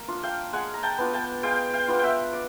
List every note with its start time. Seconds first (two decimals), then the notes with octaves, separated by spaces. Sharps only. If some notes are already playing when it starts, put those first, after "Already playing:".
Already playing: A#3
0.08 D4 F4
0.23 F5 G5
0.53 G#3 F#5 G#5
0.74 A#5
0.83 G5 A5
0.98 B3 D4 F4
1.13 G5 A5
1.43 G#3 F5 G5
1.73 F5 G5
1.88 B3 D4 F4
1.99 E5 F#5 G5
2.33 D5